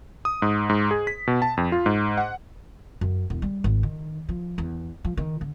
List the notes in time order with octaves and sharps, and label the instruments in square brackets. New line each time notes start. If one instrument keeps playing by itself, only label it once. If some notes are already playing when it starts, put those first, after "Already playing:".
[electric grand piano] D#6
G#2
G#2
G#4
B6
B2
A5
F2
F4
G#2
F#5
[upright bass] F#2
E1
G3
G#1
D#3
F3
E2
F3
D#3
D3